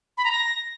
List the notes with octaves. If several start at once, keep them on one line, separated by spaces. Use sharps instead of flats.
B5
A#5
A#6